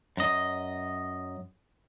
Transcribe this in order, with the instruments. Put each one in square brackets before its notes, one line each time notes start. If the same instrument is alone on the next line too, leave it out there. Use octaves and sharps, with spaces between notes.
[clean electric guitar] F#2 D#5